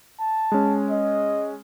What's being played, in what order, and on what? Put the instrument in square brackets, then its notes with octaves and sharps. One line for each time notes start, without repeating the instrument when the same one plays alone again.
[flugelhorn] A5
[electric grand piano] G#3 C#4
[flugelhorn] D#5